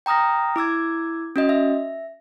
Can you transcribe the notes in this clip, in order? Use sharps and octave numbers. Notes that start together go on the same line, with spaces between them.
G5 A#5 D#6 F6 A#6
E4 D6 E6 G#6
C#4 F#4 D#5
E5